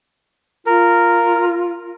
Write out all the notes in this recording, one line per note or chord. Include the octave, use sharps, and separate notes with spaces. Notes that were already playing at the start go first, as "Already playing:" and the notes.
F4 A#4